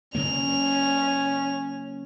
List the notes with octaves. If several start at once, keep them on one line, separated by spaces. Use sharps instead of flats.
C#3 F#3 A#3 C#4 F7